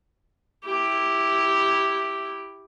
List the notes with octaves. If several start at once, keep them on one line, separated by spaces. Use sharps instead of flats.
E4 G4